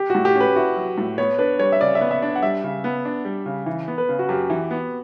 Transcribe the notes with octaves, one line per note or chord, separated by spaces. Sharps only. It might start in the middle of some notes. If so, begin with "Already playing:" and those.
Already playing: G4
A2 F#4
G4
C#4
B4
E4 F#4
F#3
A2
B3 C#5
D4 B4
G3 C#5
E5
C#3 D5
E5
B3
E5
D4
F#5
G3 E5
C#3
B3
D4
G3
C#3
E3
B3
B4
C#3
F#4
F#2 G4
E3
B3